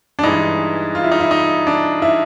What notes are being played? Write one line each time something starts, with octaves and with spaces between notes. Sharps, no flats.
D4
G2 E3 G#3 D#4
F4
E4
D#4
E4
D#4
D4
E4